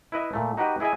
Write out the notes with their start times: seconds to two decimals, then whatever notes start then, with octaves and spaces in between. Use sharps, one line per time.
0.12 E4 B4 D#5 E5
0.33 A#2 A3
0.57 D#4 F#4 G4 B4 D#5
0.80 E4 G#4 D#5 E5 G#5